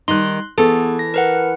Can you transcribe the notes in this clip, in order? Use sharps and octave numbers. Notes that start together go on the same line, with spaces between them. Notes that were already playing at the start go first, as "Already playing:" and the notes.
D#3 G3 D#4 C6 F#6
E3 B3 G#4 A4
A#6
A#4 B4 F#5